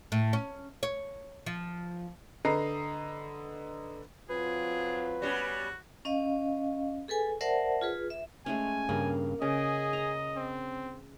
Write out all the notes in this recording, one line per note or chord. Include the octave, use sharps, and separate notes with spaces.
A2
C#4
C#5
F3
D3 B4 D#5 A#5 C7
F#3 C4 F4 G#4 B4
G3 B3 C#4 F#4
C#4 D#5 F5
G#4 A4 B4 G#5
A#4 C5 D5 E5 F#5 A5
F4 G#4 B4
E5
G#3 A3 C#4 G#5
G2 C#3 A#3
C#3 C#4 G#4 D#5
A#5
C4